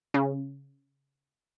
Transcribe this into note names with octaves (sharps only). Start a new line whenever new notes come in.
C#3